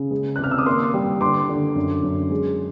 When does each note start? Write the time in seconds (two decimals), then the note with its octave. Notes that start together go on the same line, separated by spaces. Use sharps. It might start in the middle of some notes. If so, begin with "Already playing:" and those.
Already playing: C#3
0.11 G#3
0.36 F#6
0.39 C3 F6
0.51 E6
0.59 D#6
0.66 A#3 C6 D6
0.94 G3
1.21 D3 C6 D6
1.49 D3
1.76 F#2
2.03 F#2
2.31 G#3